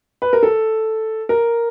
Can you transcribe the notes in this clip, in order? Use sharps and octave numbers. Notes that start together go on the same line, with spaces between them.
B4
A#4
A4
A#4